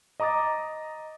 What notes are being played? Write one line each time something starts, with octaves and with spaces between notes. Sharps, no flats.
D#5 A#5 D6 D#6 A6